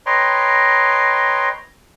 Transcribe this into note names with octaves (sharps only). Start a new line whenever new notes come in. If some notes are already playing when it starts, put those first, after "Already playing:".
B4 C#5 D#5 G5 A#5 C6